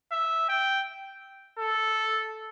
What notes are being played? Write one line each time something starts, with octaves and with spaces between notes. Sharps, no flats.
E5
G5
A4